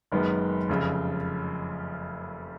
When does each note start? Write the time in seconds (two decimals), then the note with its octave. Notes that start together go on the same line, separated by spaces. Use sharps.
0.12 F#1 F#2 D#3 G#3 B3
0.69 F1 F2 C#3